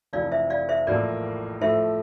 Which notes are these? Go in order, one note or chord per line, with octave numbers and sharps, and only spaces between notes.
F1 F2 E3 D5 F5
C5 E5
D5 F5
C5 E5
A1 A2 F3 A#3 A#4 D5
A2 F3 A3 C5 E5